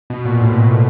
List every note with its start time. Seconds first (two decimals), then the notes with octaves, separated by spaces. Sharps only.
0.10 B2
0.25 A#2
0.41 A2
0.49 A#2
0.56 A2